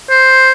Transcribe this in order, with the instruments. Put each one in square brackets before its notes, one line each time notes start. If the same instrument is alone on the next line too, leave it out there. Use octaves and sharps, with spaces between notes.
[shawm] C5